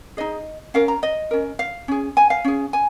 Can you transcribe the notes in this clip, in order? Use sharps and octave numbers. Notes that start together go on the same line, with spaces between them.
D#4 G#4 D#5
C#4 A#4 F5
A#5
D#5
C#4 A#4
F5
C#4 G#4
G#5
F5
C#4 G#4
G#5